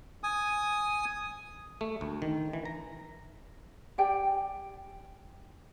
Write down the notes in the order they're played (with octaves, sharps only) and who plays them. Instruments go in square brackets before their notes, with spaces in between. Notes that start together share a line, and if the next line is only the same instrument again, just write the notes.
[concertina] G#5 D#6
[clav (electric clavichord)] A3
D2
D#3
E3
A#5
[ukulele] G4 D5 G5 G#5